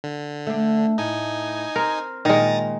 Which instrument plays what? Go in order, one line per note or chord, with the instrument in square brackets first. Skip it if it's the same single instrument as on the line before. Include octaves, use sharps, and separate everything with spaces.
[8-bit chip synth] D3
[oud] A3 D4
[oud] A2 [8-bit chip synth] D#4 G#5
[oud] C4 [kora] A#4
[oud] A#2 [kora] D#3 G#3 [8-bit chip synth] A#5 D#6 A6